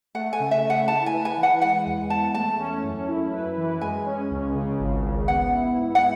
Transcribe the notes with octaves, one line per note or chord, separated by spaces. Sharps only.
A3 F#5
G#5
C#3
E5
C#3
F#5
E4 A5
G#5
B4
G#5
E3
F#5
G#3 F#5
E2
E2 A5
A3 A5
C#4
F#2
E4
B4
E3
G#3 G#5
C#4
C#2
C#3
G#1
G#1
B3 F#5
E4
G#2
F#5